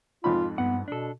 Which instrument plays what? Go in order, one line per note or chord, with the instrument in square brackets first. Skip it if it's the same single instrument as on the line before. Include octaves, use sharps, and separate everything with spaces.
[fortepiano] F2 G#2 B5 [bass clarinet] F4
[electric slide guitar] G2 F#5 [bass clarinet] B3
[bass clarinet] B2 [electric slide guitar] D4 A4